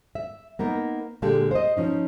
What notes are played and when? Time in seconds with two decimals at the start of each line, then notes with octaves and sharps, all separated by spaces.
0.15 E5
0.59 A#3 B3 D#4 A#4
1.22 A#2 D3 G#3 A#3 G4 A4
1.51 C5 D#5
1.77 F3 C#4 D#4